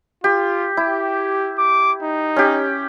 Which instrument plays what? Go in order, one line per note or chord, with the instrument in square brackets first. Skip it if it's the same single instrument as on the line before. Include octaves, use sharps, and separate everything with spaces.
[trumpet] F4 [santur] G4
[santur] E4 [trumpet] G4
[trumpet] D6
D#4
[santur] C#4 G4